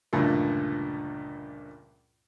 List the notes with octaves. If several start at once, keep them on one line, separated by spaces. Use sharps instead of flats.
C#2 G2 A#2 D3 F3 A3